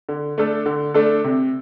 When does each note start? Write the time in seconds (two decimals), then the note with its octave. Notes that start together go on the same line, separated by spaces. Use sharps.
0.09 D3
0.38 A3 D4 A4
0.66 D3
0.94 A3 D4 A4
1.24 C3